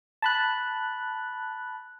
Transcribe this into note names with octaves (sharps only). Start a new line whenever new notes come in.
A5 B5 F#6